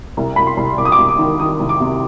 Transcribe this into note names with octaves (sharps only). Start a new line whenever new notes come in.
C2
C2 B5
C6
C2
C2 D6
D#6
D6
C2
D6
D#3
D#3 D#6
C2
D6
C3